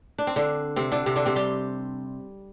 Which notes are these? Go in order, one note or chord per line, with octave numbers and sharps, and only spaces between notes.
D4
C4
D3 D4
C3 C4
D3 D4
C3 C4
D3 D4
C3 C4
G3 G4